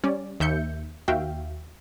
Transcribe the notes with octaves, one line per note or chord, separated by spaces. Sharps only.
G3 C#4 D5
D#2 E5 G6 C#7
D#2 F#4 E5 F5 G5